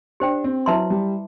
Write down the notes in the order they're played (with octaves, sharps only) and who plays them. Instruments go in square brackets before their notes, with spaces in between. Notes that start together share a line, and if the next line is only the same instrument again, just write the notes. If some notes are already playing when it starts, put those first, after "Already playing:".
[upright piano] D4 [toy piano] G4 C5 G5
[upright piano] C4
[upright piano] F#3 [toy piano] E4 B4 E5 A5 C6
[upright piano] G3